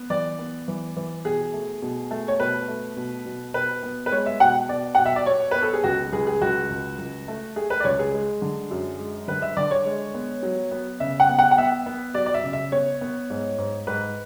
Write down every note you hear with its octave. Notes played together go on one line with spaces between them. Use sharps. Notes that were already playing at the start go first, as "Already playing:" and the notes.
Already playing: B3
E3 D5
B3
E3
E3
B2 G#4
A3
B2
A3
C#5
B2 B4
A3
B2
B2
B2 B4
B3
B4
G#3 C#5
E5
B2 F#5
B2 D5
B2 F#5
E5
D5
B3 C#5
B3 B4
A4
G#4
C#2 F#4
C#2 G#4
G#4
C#2 F#4
C#2
C#2
A3
A3 G#4
B4
D5
C#2 C#5
G#4
G#3
D3
F#2
G#3
D3 B4
E5
D3 D5
C#5
G#3
B3
F#3
B3
C#3 E5
F#5
B3
F#5
F#5
B3 E5
B3
F#3 D5
D5
E5
C#3
E5
B3 C#5
B3
G#2
G#2
G#2 B4